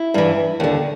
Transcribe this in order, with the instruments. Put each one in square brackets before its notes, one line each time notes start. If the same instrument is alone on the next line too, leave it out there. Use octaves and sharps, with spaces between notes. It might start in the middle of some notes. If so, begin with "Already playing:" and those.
Already playing: [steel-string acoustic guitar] E4
G2 E3
D#2 D3